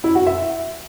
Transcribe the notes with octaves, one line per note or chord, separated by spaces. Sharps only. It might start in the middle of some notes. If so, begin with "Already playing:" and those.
E4
F#4
E5